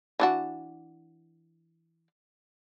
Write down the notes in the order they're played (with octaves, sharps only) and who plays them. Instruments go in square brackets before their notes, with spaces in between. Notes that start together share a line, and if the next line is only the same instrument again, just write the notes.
[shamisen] E3 D4 F#4